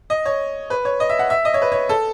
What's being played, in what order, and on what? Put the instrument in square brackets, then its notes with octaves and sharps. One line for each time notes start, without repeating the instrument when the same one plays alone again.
[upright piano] D#5
C#5
B4
C#5
D#5
E5
F#5
E5
D#5
C#5
B4
C#5
A4